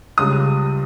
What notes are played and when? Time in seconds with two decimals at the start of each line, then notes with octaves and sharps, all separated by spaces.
0.18 C#2 C#3 G3 D#6